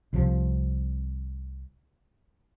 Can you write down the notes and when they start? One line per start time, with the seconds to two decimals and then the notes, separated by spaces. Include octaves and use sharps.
0.13 C2 C3 F3